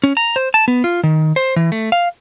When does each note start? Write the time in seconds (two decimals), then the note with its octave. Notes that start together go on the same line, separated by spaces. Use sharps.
0.04 C#4
0.17 A#5
0.36 C5
0.54 A5
0.68 B3
0.84 F4
1.03 D#3
1.36 C5
1.56 E3
1.72 A3
1.92 F5